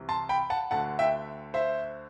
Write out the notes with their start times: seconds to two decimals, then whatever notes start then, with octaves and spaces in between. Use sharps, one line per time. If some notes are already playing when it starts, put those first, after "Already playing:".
Already playing: C2 C3 E3
0.09 A5 C6
0.29 G5 B5
0.50 F#5 A5
0.71 D2 D3 F#5 A5
0.99 E5 G5
1.54 C5 E5